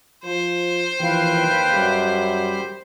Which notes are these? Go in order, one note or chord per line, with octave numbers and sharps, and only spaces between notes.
F3 C5
D#2 E3 F3 B4 F5 G5
F#2 G3 G4 B5